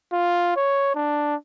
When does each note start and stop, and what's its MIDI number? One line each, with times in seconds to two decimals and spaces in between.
0.12 0.54 65
0.56 0.90 73
0.95 1.35 62